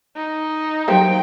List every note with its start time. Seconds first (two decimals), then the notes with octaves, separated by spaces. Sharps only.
0.17 D#4
0.88 F#3 A#3 G4 C5 G5